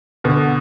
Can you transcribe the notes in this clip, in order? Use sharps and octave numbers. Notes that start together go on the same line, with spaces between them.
B2 D3